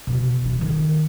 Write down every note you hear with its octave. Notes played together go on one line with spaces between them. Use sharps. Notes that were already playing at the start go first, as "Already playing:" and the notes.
B2
E3
D#3